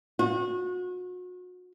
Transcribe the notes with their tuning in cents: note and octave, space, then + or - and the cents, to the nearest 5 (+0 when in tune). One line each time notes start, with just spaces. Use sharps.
F#4 -35